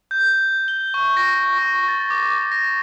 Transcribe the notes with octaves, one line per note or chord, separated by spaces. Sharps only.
G6
G7
C#6
A#6
C#6
A6
D6
A#6